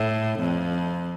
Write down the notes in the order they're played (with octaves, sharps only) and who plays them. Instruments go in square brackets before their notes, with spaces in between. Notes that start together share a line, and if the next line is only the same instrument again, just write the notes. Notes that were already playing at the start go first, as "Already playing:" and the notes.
Already playing: [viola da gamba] A2
F2